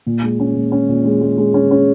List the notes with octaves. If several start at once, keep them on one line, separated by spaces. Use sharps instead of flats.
A#2
G#3
C#4
A#2
C#4
A#2
G#3
G#3
G#3
C#4
C#4